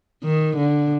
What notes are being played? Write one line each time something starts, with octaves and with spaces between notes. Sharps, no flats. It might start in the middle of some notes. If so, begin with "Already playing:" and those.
D#3
D3